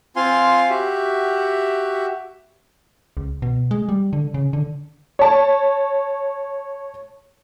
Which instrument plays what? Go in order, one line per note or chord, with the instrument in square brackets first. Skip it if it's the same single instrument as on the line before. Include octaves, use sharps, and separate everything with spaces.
[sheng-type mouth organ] C4 F4 F5 G#5 C6
F#4 G4 E5
[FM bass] C#2
B2
G#3
G3
D3
C#3
D3
[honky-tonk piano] C#5 A5